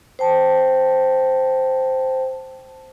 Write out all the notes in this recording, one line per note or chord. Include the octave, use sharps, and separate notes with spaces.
C5 G5 A5